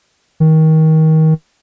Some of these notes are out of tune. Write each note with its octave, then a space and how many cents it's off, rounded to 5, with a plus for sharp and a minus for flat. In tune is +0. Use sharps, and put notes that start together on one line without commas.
D#3 +25